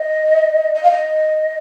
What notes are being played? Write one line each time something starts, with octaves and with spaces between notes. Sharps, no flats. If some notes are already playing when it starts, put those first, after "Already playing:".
Already playing: D#5
D#5
F5
D#5